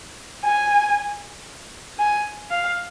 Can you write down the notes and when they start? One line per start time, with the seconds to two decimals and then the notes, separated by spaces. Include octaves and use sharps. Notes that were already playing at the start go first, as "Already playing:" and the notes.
0.45 G#5
1.99 G#5
2.51 F5